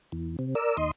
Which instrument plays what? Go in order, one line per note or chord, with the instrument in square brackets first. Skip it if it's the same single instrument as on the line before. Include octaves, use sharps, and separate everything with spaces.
[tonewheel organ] E2
C3
A#4 D5 E6
D#2 D#5 C6